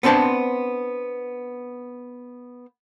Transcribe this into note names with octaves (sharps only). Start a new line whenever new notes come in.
B3 C4 D4 C5 A5